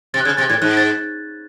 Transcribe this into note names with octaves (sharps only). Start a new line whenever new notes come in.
C3 A6
F#6
C#3 G#6
C3 A6
A2 G#6
G#2 F#6
A6